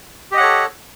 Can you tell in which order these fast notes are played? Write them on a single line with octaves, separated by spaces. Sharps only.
G4 D#5 F#5 C#5 A4